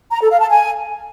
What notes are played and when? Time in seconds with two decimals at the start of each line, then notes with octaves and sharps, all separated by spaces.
0.11 A#5
0.20 A4
0.29 F5
0.39 A5
0.48 G#5